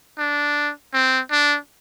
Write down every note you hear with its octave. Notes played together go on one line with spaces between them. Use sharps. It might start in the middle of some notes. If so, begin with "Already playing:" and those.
D4
C4
D4